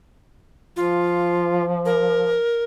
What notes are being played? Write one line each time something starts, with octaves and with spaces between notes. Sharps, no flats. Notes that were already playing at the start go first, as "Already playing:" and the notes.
F3 F4
A#4